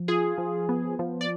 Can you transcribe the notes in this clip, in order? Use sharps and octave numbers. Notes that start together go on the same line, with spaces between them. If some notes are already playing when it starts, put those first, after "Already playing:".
Already playing: F3
F4 G#4
F3
B3
F3
D5